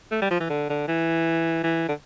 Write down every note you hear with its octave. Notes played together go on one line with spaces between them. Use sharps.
A3
G3
F3
E3
D3
D3
E3
E3
D3